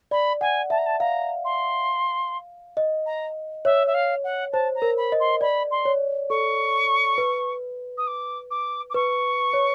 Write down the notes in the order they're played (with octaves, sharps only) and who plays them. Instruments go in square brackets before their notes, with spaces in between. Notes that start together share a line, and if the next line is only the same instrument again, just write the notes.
[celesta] D5 [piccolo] B5
[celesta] F#5 [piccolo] G#5
[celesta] E5 [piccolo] A5
[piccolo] A#5
A5
[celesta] F5 [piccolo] A#5
[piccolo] C6
[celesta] D#5
[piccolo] A#5
[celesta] C#5 [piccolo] E5
[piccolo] E5
F5
F#5
[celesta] C5 [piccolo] A5
[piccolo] A#5
[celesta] A#4
[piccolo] B5
[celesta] D#5
[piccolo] C6
[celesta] D5 [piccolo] B5
[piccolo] C6
[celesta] C#5
[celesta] A4 [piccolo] C#6
[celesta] B4
[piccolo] D#6
D6
D6
D6
[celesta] B4 [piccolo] C#6
[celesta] C#5